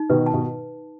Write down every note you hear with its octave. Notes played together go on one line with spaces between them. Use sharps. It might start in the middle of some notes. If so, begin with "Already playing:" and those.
Already playing: D#4
B2 D#3 B4
A5
B2